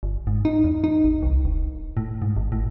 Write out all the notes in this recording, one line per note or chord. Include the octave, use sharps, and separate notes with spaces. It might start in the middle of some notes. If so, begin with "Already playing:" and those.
G1
G#2
D#4
E2
D#4
A1
C2
E1
A2
G#2
G#1
A2